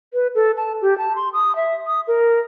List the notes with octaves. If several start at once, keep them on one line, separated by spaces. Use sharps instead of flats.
B4
A4
A5
G4
A5
C6
D#6
E5
D#6
A#4